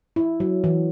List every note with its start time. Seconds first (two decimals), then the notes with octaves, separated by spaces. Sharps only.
0.16 E4
0.40 F#3
0.64 E3